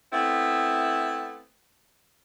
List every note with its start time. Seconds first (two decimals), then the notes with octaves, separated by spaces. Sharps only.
0.12 A3 B3 C4 E4